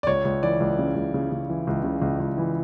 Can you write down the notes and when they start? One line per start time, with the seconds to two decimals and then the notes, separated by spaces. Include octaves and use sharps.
0.03 D5
0.07 C#2 C#5
0.25 C#2
0.43 E3 D5
0.60 C#2
0.79 C#3
0.95 C#2
1.14 C#3
1.32 C#3
1.50 E3
1.67 C#2
1.84 C#3
2.02 C#2
2.20 C#2
2.38 E3